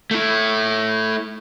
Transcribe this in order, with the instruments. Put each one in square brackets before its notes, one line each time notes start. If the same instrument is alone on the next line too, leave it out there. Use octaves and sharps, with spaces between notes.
[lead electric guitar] A3 E4